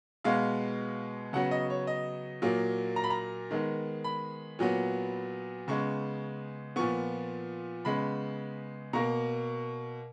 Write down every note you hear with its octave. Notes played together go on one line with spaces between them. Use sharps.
B2 G#3 B3 F5
C#3 F#3 B3 F#5
D#5
C#5
D#5
A#2 F#3 A#3
A#5
B5
A#5
D#3 G#3 B3
B5
A#2 F#3 B3
C#3 G#3 B3 C#6
A#2 F3 B3 C#6
C#3 G#3 B3 B5
B2 A#3 A#5